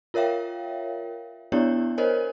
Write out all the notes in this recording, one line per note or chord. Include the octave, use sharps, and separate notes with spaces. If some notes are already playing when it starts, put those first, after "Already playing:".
F4 A#4 C#5 E5 F5 G5
B3 D4 E4 G4 C#5 D5
A#4 C5 C#5 D#5 G#5